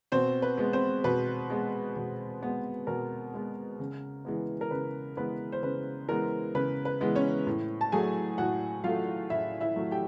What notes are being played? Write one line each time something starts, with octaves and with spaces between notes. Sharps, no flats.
B2 C4 C5
B4
G#3 B3
C4 C5
B2 B4
G#3 B3
B2
G#3 B3
B2 A#4
G#3 B3
C#3
E3 G#3 B3
A#4
C#3 B4
E3 G#3 B3 B4
C5
C#3 B4
E3 G#3 B3 A#4
C#3 B4
B4
E3 G#3 B3
C#4 C#5
A2
A5
F#3 A3 G#4 G#5
A2 F#4 F#5
F#3 A3 F4 F5
A2 E4 E5
E4 E5
F#3 A3
G4 G5